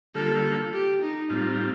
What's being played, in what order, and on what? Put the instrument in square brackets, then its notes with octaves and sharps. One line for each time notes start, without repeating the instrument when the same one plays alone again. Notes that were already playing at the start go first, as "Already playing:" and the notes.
[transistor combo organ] D3 G3 A#3 F4 [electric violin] A4
[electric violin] G4
D#4
[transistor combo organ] A2 G3 C4 F4 [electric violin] D#4